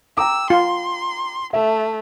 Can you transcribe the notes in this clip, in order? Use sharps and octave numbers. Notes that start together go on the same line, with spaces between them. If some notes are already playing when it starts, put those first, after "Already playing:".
G5 A#5 D6 E6
F4 C6
A3 E5